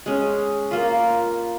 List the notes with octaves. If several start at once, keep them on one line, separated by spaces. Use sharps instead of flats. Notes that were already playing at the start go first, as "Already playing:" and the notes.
G#3 C#4
A#3 F4